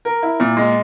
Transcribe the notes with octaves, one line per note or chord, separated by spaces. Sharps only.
A#4
E4
A#2
G#3